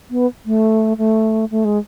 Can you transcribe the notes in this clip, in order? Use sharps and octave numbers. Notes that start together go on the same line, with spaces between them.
B3
A3
A3
A3
G#3